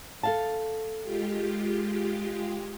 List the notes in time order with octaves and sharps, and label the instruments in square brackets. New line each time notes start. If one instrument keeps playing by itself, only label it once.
[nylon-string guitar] A4 F5 A5
[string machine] G#3 F4 G4